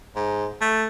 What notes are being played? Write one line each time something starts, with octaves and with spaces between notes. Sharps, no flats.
G#2
A3